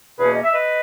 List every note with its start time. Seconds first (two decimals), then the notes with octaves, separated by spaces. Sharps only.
0.18 E2 B2 A#3 C#4 G#4 B4
0.33 D#5
0.43 E5
0.53 B4 D#5